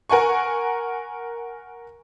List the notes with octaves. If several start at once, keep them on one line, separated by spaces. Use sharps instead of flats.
A#4 F#5 G#5 C#6